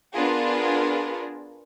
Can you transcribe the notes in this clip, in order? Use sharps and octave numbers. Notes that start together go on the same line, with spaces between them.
B3 D4 F4 G#4 A#4